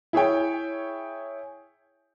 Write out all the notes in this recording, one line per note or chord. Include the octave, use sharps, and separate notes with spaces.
E4 G#4 C#5 G5